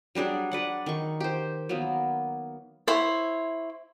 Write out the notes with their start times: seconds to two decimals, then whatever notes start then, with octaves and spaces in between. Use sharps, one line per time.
0.15 F#3 G3 D4 G#4
0.51 B4 D5 F#5
0.86 D#3 C#6
1.20 G4 C5
1.69 F#3 A#3 B3
2.87 E4 C5 C#5